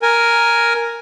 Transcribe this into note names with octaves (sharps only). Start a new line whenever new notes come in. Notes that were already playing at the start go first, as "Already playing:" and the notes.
A#4 G#5